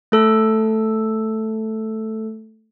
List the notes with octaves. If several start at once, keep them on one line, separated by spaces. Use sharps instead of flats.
A3 A4 E6